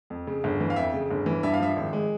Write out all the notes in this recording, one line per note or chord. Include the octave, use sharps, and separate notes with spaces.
F2
C#3
G1
E3
F5
F2 E5
C#3
G1
E3
G2 E5
F5
F3 E5
G#1
G#3